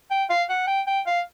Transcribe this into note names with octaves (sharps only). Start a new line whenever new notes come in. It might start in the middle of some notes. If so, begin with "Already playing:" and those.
G5
F5
F#5
G5
G5
F5